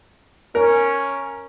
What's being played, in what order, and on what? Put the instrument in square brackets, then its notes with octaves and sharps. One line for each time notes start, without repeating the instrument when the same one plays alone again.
[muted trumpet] C#4 [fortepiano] A#4